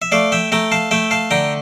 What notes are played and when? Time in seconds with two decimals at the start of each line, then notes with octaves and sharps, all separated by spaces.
0.02 E5
0.12 A3 D5 F5
0.32 E5 G5
0.52 A3 G5 A#5
0.72 F5 A5
0.91 A3 E5 G5
1.11 F5 A5
1.31 D3 G5 A#5